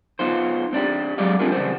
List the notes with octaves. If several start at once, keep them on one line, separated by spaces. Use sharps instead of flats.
B3 D#4 F4 C5
C4 D4 F4 G4
F#3 G#3 G4 D5 D#5 F5
B3 C4 D4 E4 F4 A#4
E2 C#3 G3 B3 C4 C5